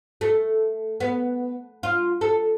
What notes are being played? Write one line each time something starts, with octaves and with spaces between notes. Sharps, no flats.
A3
B3
F4
A4